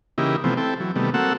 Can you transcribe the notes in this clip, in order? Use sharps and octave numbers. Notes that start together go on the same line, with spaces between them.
C#3 E3 A#3 D#4 E4 G4
C3 E3 F3 A3 B3 C4
C4 E4 A4 G5
E3 F#3
C3 D#3 G3 A3 B3
A#3 C4 F#4 A4 F#5 E6